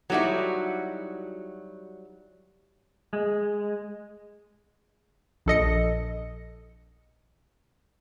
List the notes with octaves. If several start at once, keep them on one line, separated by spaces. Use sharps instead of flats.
F#3 G3 D#4 E4 F#4 A4
G#3
A#1 A4 D#5 C#7